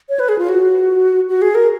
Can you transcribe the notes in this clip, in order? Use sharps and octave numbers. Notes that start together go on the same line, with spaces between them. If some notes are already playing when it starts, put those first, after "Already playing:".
C#5
B4
G#4
F4
F#4
F#4
G#4
A#4